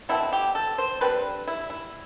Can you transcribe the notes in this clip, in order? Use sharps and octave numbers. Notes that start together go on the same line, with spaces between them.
B2 A3 C4 E4
G4
A4
C5
D3 G3 C4 B4
E4
E4